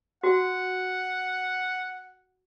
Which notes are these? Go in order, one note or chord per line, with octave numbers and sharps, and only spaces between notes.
F#4 F#5